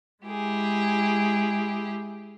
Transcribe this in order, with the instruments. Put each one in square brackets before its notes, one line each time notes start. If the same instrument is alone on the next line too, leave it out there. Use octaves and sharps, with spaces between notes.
[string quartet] G#3 E4 G4 G#4